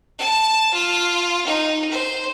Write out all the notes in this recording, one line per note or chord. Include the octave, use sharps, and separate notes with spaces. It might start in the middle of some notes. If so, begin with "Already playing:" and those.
A5
F4
D#4
C5